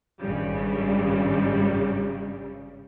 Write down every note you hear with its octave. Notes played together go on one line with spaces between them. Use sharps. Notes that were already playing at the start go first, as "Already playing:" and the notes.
G#1 G2 C#3 G3